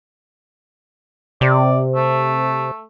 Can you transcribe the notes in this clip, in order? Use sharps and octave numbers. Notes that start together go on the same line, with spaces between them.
C3 D5
A3